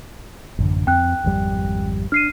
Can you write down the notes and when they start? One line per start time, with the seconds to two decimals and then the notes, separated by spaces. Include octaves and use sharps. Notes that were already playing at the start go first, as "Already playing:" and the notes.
0.59 A1 F#2 D3
0.87 F2 C4 G5 F#6
1.24 G#1 F2 G3
2.12 D4 F6 C7 D#7